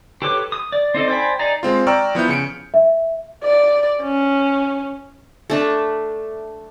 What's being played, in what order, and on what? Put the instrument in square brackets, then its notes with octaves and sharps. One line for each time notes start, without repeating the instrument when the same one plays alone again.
[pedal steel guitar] G4 A4 B4 C#5 D6
D#6
D5
C4 D#4 A4 D5
C5 D5 G5 G#5 B5
D#4 G#4 D5 A#5
[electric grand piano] G#3 C4 F4
D5 G5 A#5 C#6 E6 F6
F3 B3 E4 G6
C#3 C#7 D7
[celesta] E5
[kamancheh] D5
C#4
[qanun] A3 D4 E5